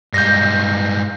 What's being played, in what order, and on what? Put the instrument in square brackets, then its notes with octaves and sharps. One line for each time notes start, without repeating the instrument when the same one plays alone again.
[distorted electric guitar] G2 G#3 [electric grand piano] G6 A#6